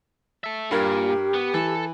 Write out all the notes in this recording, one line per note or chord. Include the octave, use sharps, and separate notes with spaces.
A4 E5
G2 A#2 G4 A#4
B3
E3 A4